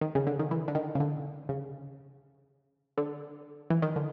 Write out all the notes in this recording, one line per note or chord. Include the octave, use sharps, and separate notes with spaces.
D#3
C#3
D3
D#3
E3
D3
D#3
C#3
D3
C#3
D3
E3
D#3
D3